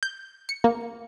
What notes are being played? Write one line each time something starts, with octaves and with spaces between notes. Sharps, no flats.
G6
C#7
A#3